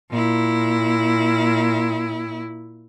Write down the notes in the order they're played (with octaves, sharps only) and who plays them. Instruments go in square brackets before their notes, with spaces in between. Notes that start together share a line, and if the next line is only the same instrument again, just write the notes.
[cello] A#2 E4